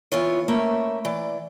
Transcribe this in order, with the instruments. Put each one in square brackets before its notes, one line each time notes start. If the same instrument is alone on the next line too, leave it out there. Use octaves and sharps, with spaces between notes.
[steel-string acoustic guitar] E3 B3 F4 C#5
A3 A#3 C#4 B4 C5 E5
E3 D5